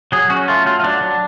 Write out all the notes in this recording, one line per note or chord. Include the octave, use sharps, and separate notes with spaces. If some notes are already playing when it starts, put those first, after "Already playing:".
F#3 G#4
C#4 F#4
A3 F4
F#3 F4
F4
F#3 D4
F#3